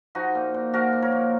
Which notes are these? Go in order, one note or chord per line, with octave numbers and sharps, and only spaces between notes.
F3 D#4 F#4
A#2
A#2
F3 F#4 A#4
A#2
A#4 C#5
A#2